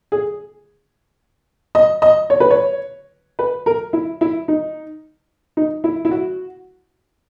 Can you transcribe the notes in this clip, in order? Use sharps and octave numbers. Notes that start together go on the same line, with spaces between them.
G#4
D#5
D#5
C#5
B4
C#5
B4
A#4
E4
E4
D#4
D#4
E4
E4
F#4